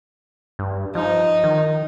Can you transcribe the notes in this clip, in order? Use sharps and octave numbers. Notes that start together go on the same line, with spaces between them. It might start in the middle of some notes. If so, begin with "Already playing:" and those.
G2
F3 D#4
D#3